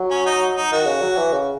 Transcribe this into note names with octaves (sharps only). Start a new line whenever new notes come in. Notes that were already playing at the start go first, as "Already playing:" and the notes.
Already playing: F#3
C#4
D#4
D#4
D#3 F#4
C#3
F#3
E3
C#3